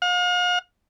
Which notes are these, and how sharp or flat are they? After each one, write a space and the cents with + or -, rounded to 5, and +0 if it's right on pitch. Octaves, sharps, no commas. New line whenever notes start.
F5 +40